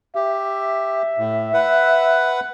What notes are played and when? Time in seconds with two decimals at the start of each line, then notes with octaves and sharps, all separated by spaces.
0.15 G4 E5
1.18 A2
1.54 B4 F#5